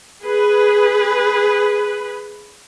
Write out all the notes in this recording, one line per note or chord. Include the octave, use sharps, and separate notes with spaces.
G#4 B4